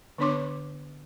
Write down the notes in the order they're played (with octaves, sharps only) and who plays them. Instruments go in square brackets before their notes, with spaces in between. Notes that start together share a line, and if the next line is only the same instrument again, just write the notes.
[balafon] D3 B3 D4 C#5 C6 D6